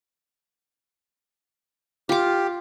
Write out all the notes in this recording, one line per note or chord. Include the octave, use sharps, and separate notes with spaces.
F4 G4 D6